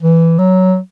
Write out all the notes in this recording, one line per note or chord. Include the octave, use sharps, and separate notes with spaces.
E3
F#3